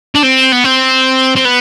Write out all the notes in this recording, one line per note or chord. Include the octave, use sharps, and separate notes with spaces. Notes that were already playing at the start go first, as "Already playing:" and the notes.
D4
C4
B3
C4
C4
B3